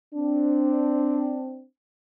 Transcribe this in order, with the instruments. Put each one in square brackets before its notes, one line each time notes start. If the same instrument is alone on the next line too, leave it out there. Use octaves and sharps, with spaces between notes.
[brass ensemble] C4 D4